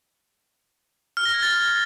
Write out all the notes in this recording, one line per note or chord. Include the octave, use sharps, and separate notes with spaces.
F6
A#6
G#6
A6